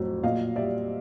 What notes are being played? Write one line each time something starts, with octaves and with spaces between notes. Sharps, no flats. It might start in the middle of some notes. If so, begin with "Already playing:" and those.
Already playing: F2 A2 F#3
A#2 D#5 F5
G3 D5 E5